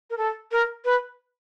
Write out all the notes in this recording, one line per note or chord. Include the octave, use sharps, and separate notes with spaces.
A#4
A4
A#4
B4